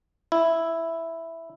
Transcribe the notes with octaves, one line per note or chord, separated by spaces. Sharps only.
E4